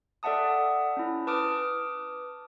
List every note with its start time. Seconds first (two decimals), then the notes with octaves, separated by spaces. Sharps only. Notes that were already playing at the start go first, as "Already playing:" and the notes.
0.23 A4 D5 E5 F#5 A5 D#6
0.97 C#4 E4
1.27 B4 A5 D6 D#6 F6 D7